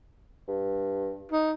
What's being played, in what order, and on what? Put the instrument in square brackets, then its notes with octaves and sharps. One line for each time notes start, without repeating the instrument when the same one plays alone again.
[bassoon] G2
[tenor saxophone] D#4